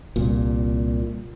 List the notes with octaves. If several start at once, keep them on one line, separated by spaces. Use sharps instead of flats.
C2 A#2